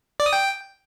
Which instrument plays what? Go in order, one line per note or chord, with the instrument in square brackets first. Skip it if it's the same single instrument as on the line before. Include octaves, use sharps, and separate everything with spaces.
[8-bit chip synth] D5
D#6
G5